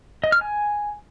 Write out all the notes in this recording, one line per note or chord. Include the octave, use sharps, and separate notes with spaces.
D#5
F6
G#5